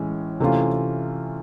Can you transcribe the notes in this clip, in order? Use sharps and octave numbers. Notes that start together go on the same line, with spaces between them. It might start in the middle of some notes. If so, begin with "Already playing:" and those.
Already playing: A2 E3 G#3 C#4
C3 E3 A3 C#4 F4